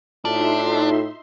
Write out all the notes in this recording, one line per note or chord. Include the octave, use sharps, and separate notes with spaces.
A2 D4 D#4 F4 F#4 A4 E5 C6